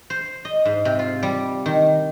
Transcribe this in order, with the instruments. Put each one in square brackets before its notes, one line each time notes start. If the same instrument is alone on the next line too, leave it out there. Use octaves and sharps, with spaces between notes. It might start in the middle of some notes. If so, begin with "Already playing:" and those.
[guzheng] C5
D#5
G#2
C3
F4
G3
D#3